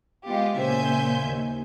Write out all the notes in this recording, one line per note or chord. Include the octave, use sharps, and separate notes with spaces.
G#3 B3 F4 G4
A#2 C#3 C5 E5 G#5 G6
D#2